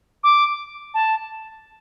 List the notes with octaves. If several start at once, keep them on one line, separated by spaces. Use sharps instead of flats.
D6
A5